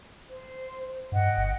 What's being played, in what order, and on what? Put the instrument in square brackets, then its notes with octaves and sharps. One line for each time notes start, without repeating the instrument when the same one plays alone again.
[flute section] C5
[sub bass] G2 [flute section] D#5 F#5 G5
[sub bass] G1